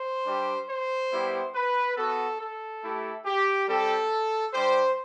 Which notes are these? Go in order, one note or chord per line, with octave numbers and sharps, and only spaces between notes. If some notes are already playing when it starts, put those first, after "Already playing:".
Already playing: C5
G3 D4 G4
C5
G3 B3 E4 G4
B4
B3 F#4 A4
A4
A3 E4 G4
G4
G3 C4 G4 A4
G3 D4 G4 C5